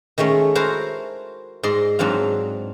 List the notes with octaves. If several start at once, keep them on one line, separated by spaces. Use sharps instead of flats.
D#3 G#3 A3 C#4
E4 F#4 A#4 C5 A5
G#2 D5 D#5 C6
G#2 F#3 C4 D4 F4